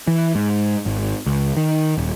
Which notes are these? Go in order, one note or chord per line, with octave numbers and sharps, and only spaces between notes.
E3
G#2
G#1
C#2
D#3
D#1